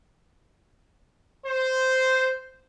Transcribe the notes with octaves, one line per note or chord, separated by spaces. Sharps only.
C5